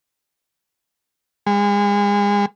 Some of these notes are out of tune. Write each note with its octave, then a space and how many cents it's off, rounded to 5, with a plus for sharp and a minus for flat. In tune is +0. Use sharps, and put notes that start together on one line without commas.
G#3 -35